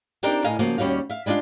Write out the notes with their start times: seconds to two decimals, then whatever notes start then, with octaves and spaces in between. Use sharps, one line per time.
0.23 C4 D4 D#4 G4 A#4
0.44 A2 D#5 F5 G#5
0.59 C#3 F3 A#3 F#4 C5
0.78 D#2 G3 C#4 F#4 F5
1.09 E5 F5
1.26 G3 G#3 D4 D#4 F4